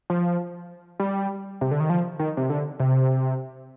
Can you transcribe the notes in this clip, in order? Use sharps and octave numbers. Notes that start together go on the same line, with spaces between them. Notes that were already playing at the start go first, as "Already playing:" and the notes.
F3
G3
C3
D3
D#3
F3
D#3
C3
D3
C3